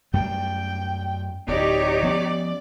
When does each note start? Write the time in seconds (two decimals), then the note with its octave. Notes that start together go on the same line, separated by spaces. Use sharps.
0.13 F#2 G3 A3 G5
1.48 D1 D#4 G4 C#5 D5
2.02 F3 B3 C#4